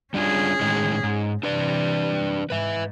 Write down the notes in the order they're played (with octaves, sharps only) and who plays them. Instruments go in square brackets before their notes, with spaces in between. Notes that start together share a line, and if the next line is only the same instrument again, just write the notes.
[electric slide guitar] G3 D4 F4 [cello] C#4 G#4
[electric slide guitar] A2 D#3 G#3
G#2
[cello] C3 E3 [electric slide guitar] D4 B4 D5
[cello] G#2 [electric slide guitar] B4 E5